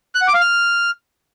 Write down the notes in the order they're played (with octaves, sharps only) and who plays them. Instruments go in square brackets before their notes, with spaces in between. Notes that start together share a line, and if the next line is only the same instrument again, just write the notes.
[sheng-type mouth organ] F#6
F#5
D6
F5
F6